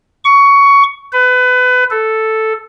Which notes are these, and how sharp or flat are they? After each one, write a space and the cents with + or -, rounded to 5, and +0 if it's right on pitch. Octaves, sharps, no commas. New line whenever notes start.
C#6 +15
B4 +25
A4 +0